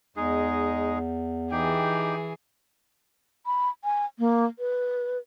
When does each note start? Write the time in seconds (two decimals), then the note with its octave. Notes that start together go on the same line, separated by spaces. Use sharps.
0.17 E2 G#3 D#4 G#4
1.51 E3 D#4 G4 G#4 G5
3.46 B5
3.84 G#5
4.19 A#3
4.59 B4